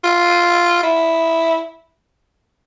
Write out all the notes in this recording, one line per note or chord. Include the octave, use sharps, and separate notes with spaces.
F4
E4